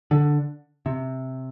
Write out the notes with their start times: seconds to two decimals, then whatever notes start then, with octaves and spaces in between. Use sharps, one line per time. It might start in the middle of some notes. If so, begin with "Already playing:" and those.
0.11 D3
0.86 C3